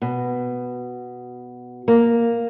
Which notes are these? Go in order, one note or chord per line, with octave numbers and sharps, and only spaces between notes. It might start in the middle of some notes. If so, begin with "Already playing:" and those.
B2
A#3